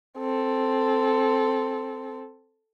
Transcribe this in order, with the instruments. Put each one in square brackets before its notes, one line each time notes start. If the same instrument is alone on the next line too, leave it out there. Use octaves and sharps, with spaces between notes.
[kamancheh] C4 A4